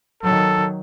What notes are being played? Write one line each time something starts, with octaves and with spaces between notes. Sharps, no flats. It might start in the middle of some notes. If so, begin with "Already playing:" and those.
D#3 F#3 A4